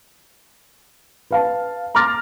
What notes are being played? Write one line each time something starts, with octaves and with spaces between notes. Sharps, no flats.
B4 F5 A5
A#5 C6 D6 F6 A6 A#6